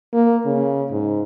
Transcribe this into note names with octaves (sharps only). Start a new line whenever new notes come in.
A#3
C#3
G#2